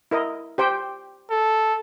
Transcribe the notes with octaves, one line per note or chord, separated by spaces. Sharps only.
E4 A#4 D#5
G4 C5 G5
A4